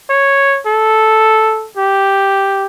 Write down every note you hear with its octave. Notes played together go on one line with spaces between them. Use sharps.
C#5
A4
G4